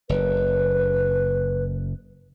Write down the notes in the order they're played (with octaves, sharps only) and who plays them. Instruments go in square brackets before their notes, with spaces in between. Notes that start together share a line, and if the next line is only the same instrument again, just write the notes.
[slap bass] F#1 [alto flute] B4